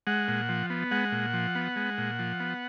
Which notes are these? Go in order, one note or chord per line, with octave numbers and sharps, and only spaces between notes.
G#3 F#5
A#2
F3
B3
G#3 F#5
A#2
F3
B3
G#3
A#2
F3
B3